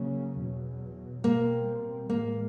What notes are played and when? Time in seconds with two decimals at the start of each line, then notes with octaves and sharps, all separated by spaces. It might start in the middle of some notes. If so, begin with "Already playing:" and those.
Already playing: C#3 F#3 A#3 C#4
0.39 E2 B2 F#3
1.24 B2 G3 A#3 C4
2.08 A2 E3 G#3 A#3